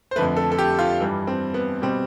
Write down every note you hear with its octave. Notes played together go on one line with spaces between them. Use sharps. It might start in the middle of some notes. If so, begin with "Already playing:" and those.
C5
F2 D3 F3 A3 B4
A4
A4
G4
F4
G2 E3 G3
C4
B3
B2 G3 C4